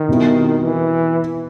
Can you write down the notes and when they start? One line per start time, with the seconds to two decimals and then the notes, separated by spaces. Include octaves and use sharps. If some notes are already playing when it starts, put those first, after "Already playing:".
Already playing: D#3
0.08 B2 G3 C4 E4
0.64 E3